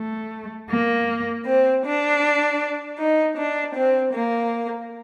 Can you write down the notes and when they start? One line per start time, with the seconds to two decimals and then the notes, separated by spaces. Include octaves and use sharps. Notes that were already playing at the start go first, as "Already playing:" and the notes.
Already playing: A3
0.69 A#3
1.45 C4
1.84 D4
2.98 D#4
3.37 D4
3.74 C4
4.13 A#3